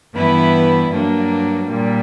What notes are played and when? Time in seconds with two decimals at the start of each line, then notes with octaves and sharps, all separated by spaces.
0.13 G2 E3 B3 E4 B4
0.91 G2 F#3 A#3 D4
1.68 A#2 G3 A#3